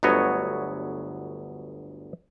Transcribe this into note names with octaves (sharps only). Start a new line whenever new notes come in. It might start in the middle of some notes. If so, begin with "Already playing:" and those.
G1 D2 F#3 B3 C#5 D#5